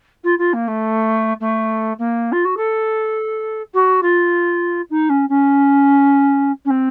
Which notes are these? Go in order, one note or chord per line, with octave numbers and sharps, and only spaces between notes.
F4
F4
A#3
A3
A3
A#3
F4
F#4
A4
F#4
F4
D#4
C#4
C#4
C#4
C4